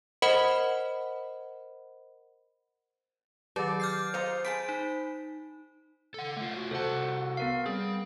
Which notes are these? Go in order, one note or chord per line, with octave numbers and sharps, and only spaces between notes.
A#4 C5 D#5 F#5 B5
D#3 F#3 G4 D5
D6 F6 G6 C7
F4 C5 D#5 A#5
G#4 A5 B5 D7
D#4
A4 F#5
A3 F4
F#4
C2 A4 C5 F#5 A5
B3 A#4 F5
G3 C4 G#4